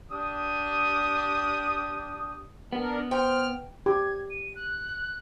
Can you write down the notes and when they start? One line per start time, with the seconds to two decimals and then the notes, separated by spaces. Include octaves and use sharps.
0.12 D4 G4 D#6
2.73 B3 D4 A#4
3.11 C5 G5 F6
3.86 G4 G#6
4.30 D#7
4.55 F#6